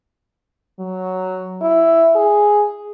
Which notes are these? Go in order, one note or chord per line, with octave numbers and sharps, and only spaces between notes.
F#3
E4
G#4